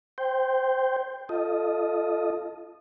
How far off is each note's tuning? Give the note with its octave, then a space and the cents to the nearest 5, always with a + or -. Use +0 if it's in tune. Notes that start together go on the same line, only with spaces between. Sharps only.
C5 -5 G5 +0
F4 -10 A4 +0 D#5 +0